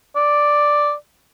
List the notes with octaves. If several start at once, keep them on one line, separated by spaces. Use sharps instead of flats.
D5